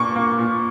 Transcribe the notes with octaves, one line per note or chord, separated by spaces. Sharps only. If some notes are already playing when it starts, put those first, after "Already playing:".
Already playing: A#2 A#3 D4 C#6
A#3
A#2